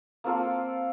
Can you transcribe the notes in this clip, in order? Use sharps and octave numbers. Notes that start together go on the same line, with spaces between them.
A#3 C4 F4 A4